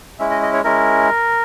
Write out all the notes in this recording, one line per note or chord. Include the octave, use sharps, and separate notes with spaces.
G#3 C#4 E4 E5
D#5
D#5
C#5
G#3 C#4 E4 A#4